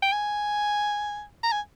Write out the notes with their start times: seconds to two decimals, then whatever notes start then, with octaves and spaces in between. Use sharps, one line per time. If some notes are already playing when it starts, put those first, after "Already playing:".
0.03 G5
0.13 G#5
1.43 A#5
1.52 G#5